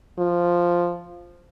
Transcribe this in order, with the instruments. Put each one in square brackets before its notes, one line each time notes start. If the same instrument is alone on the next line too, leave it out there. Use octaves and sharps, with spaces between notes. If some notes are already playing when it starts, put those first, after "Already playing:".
[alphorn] F3